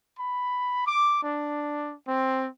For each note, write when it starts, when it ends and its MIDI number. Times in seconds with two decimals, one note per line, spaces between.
0.19 0.85 83
0.86 1.22 86
1.23 1.93 62
2.08 2.48 60